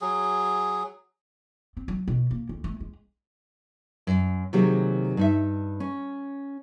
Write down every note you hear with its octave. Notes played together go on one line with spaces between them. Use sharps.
F#3 G#4
C4
F#3
B2
A#3
D2
A3
G#3
F#2
C3 D#3 F#3 A#3 G4 G#4
G2 D#4 E5
C#4